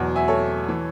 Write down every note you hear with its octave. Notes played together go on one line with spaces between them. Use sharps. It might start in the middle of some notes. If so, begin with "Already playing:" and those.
Already playing: E2 B2 F#3
E5 G#5
A4 C#5
E3